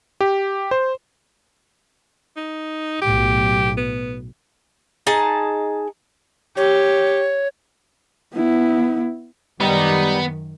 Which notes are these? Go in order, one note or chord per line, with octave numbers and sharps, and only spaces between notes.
G4
C5
D#4
B1 A2 G4
B3
D#4 G#4 A5
G4 C#5
B3 E4
F#2 D#3 G3 B3 D#4